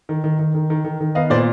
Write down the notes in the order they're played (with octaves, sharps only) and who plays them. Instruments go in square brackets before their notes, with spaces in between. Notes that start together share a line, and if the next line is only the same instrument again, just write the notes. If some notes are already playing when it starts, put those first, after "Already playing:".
[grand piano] D#3
D#3
D#3
D#3
D#3
D#3
D#3
B3 D#5 F5
A#2 C5 D5